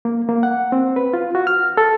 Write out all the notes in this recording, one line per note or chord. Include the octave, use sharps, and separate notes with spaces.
A#3
A#3
F#5
C4
B4
F4
F#4
F6
A4